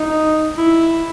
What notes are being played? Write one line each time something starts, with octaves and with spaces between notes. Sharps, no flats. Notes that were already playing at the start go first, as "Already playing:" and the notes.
Already playing: D#4
E4